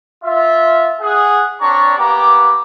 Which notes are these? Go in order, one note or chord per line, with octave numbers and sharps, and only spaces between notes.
F4 E5
G#4 F#5
C4 D4 C#5 D5 A#5 C#6
A#3 B3 G4 A#5 D6